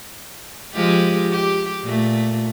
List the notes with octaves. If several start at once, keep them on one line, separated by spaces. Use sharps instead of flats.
F3 G#3 G4
G4
A#2 A3